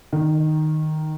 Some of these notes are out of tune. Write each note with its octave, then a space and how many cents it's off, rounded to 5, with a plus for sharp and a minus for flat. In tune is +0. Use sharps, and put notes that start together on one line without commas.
D#3 -5